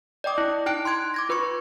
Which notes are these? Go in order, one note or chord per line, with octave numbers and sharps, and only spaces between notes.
D5 D#5 G5 D6 D#6
E4
D#4 E4 G5 F#6 D7
C6 F#6 G#6 D7
D6 G#6 A#6
F4 B4 B5 C#6 C#7